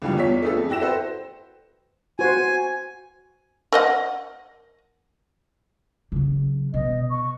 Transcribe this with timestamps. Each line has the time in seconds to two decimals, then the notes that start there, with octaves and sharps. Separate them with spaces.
0.02 C#2 D3 E3 F3 G3
0.16 E2 F4 C#5 B6
0.42 A3 B3 D4 F4 G#4 A4
0.57 F2
0.69 E4 F#4 G5 A#6 E7
0.81 A4 B4 C5
2.19 F#4 C5 G#5
3.72 A#4 D#5 F#5
6.12 C#3 F#3
6.74 B2 D#5
7.10 C#6